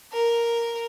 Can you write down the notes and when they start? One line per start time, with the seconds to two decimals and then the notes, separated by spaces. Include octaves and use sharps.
0.13 A#4